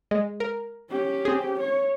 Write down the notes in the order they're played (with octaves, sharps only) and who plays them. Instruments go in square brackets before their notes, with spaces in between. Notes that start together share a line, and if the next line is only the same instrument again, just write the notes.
[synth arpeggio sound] G#3
A#4
[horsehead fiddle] C#4 G4
[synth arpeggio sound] C4 G#4
[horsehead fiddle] C#5